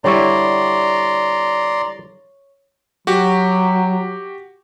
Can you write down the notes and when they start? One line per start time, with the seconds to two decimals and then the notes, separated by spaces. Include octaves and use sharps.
0.04 D3 G3 E4 C#5 D5 A#5 C6 C#6
3.07 F#3 F#4 G4